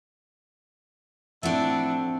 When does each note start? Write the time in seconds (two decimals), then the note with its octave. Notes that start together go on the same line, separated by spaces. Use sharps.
1.43 A2 F3 C4 D4 E5 F#5